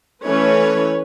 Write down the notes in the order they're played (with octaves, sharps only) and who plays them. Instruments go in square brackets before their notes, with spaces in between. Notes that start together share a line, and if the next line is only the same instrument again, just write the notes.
[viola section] E3 A3 C#4 B4 C#5